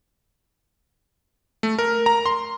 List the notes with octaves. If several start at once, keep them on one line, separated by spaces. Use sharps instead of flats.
A3
A#4
A#5
C6